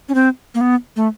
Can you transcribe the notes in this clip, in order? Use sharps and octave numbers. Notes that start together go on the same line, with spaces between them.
C#4
C4
A#3
B3
A3